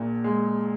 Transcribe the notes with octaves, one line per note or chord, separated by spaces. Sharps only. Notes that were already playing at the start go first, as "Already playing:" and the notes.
Already playing: A#1 A#2
G#3